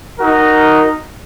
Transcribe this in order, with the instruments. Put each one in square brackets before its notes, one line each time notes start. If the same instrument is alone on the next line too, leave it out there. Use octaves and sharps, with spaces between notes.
[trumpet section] D#4 F#4 A#4